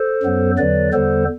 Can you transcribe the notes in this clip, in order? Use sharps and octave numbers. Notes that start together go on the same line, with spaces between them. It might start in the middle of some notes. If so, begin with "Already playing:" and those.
Already playing: A4 C5
F#2 F#3 B3
E2 D3 F#3 B4 D5
E2 D3 G3 B3 A4 C5